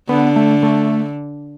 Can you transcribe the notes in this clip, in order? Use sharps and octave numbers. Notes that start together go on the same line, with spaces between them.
D3 B3
A3
A3